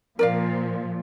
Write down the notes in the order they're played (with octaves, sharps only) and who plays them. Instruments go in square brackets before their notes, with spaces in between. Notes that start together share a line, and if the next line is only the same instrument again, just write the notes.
[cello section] A#2 F3 [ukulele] A#4 D5 F5